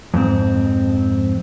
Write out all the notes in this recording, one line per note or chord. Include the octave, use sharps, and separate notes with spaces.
F2 G#2 C4